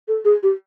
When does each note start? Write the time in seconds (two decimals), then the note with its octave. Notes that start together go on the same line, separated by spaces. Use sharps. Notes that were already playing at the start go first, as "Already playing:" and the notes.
0.08 A4
0.25 G#4
0.43 G4